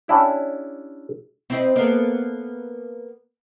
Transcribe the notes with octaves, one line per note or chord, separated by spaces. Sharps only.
C#4 D4 E4 G4
C4 E4 D#5
A#3 B3 A4